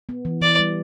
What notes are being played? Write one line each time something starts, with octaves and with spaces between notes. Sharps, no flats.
B3
E3
E3 D5
G3